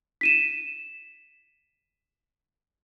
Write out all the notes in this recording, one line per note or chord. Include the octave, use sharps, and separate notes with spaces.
B6 D#7 E7